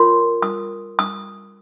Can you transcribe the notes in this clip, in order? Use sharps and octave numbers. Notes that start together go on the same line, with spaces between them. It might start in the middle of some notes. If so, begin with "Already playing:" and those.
Already playing: F4 A#4 C#5 C6
D#6
D#6